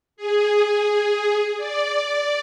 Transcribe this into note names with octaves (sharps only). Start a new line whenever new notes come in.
G#4
D5